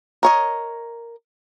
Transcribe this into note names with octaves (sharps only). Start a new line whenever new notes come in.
A#4 C#5 D#5